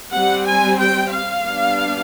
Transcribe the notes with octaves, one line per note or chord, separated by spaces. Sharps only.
G3 C4 F#5
G#5
G5
F5
G3 B3 D4